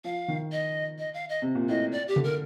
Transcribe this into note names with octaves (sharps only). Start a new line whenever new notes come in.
F3 F5
D#3
D#5
D#5
F5
D#5
C3
A#2
A2 D#5
D5
G4
D3
A#4